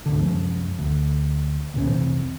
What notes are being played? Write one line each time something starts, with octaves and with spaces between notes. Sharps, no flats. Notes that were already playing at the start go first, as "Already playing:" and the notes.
G#1 D2 D3
C2 F#2 F3 G#3
D2
D2 A#2 C#4
F1 C2 E3 C4